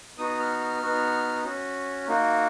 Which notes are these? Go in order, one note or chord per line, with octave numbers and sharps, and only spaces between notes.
B3 D#4 F#4 D#6
F6
F6
B3 D#4 F#4
C#4 F#4
A#3 D#4 F#4